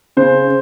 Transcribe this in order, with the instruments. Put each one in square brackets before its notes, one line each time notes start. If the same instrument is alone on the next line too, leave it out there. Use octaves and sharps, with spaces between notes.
[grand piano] C#3 C5